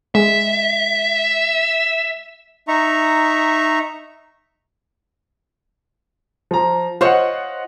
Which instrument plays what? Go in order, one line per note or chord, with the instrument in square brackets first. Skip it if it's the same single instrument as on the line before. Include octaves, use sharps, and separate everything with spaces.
[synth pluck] G#3 [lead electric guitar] E5
[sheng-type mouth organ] D#4 E5 A#5 C#6
[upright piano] F3 A#5
[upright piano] F4 D#5 F#5 [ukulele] C5 C#5